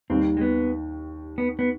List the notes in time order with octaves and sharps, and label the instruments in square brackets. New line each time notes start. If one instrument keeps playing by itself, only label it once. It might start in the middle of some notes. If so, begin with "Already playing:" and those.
[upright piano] D#2 D#3 G3 [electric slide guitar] C4
[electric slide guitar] G#3
B3
B3
B3